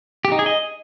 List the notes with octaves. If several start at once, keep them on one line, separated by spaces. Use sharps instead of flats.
G4
D#4
G#4
D#5